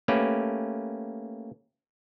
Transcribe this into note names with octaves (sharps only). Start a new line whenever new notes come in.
A3 A#3 C#4 G4 B4